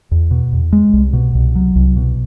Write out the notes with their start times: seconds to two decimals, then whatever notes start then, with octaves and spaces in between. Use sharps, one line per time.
0.11 E2
0.31 B2
0.53 E2
0.73 G#3
0.93 C2
1.13 B2
1.35 C2
1.55 F#3
1.76 C2
1.96 B2